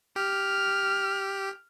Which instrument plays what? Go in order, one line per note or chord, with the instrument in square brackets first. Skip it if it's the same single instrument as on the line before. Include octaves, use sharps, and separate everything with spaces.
[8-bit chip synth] G4 [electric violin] F6